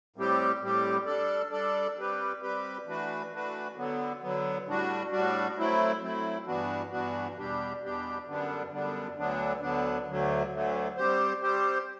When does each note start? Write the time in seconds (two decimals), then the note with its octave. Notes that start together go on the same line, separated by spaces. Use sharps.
0.16 A2 G3 C4 G4
0.61 A2 G3 C4 G4
1.06 G3 D4 A4 D5
1.51 G3 D4 A4 D5
1.96 G3 C4 G4 B4
2.42 G3 C4 G4 B4
2.86 E3 A3 D4 F#4 B4
3.31 E3 A3 D4 F#4 B4
3.77 D3 F#3 B3
4.22 D3 F#3 B3
4.66 A2 G3 D4 F#4
5.11 A2 G3 D4 F#4
5.57 F#3 A3 C4 E4
6.01 F#3 A3 C4 E4
6.47 G2 E3 B3 D4 F#4
6.91 G2 E3 B3 D4 F#4
7.37 E2 B2 G3 D4 G4
7.82 E2 B2 G3 D4 G4
8.27 F#2 D3 G3 B3 D4
8.72 F#2 D3 G3 B3 D4
9.17 D2 D3 F#3 B3 D4
9.62 D2 D3 F#3 B3 D4
10.07 D2 D3 F#3 A3
10.52 D2 D3 F#3 A3
10.97 G3 C4 G4 C5
11.42 G3 C4 G4 C5